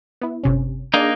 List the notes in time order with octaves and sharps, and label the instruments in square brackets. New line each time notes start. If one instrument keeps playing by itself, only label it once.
[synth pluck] B3 E4
G1 C3 C#4
[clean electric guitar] A#3 D#4 [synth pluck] D4 G#4 D5